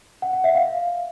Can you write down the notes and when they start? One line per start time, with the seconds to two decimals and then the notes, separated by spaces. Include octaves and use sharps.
0.22 F#5
0.33 F#5
0.44 E5
0.55 F5